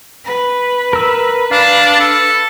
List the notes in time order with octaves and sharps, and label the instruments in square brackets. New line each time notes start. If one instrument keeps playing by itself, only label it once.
[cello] B4
[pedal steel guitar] A#4 E6
[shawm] D4 [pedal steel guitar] F5
[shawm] A4